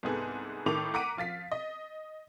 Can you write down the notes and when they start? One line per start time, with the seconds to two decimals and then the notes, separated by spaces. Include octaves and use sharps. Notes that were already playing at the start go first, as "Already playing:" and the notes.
0.03 C2 G#2 B3 G#4 A4
0.66 A2 D#3 A3 A5 D6 F7
0.94 F#5 A#5 D6 B6 D7 D#7
1.17 F3 F5 A6 B6
1.52 D#5